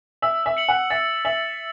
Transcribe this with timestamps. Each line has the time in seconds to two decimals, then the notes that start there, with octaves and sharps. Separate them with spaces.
0.22 E5 E6
0.46 E5
0.57 C#7 F#7
0.68 F#5
0.90 E5 A6
1.25 E5 F#7